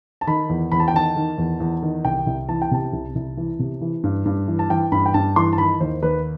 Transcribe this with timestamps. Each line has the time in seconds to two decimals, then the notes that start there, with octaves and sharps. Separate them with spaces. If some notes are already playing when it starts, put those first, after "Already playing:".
0.21 A5
0.27 D#3 B5
0.49 E2
0.72 E2 B5
0.80 A5
0.88 G5
0.94 D#3 A5
1.16 D#3
1.38 E2
1.60 E2
1.82 D#3
2.05 C2 G5
2.26 C2
2.48 E3 A5
2.62 G5
2.71 C3 A5
2.93 C2
3.15 C2
3.37 E3
3.59 C3
3.81 E3
4.04 G2
4.25 G2
4.48 E3
4.59 A5
4.70 E3 G5
4.92 G2 B5
5.06 G5
5.14 G2 A5
5.36 E3 C6
5.53 A5
5.58 D#3 B5
5.80 D#2 C5
6.02 D#2 B4